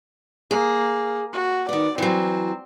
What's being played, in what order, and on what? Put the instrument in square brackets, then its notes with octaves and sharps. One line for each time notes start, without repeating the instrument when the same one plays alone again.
[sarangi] A#3 [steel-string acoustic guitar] G#4
[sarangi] F#4
[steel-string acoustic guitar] D#3 B3 [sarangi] D5
[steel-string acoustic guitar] E3 F#3 [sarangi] C4